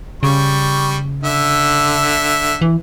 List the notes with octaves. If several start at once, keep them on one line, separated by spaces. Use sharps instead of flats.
C#3 G3 C#6
D3 E5
E3